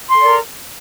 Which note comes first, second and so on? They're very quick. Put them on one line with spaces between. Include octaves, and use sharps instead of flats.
C6 A4 D5 A#4